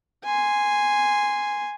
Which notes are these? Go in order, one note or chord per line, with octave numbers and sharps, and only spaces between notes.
G#5 C6